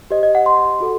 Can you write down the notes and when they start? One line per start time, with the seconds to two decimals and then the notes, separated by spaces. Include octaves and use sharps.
0.11 G4 C5 D#5
0.23 D#5
0.35 F#5
0.46 C6
0.80 F#4 A4